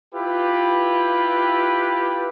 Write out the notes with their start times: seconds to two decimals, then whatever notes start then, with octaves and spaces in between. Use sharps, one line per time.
0.15 E4 F4 G4 B4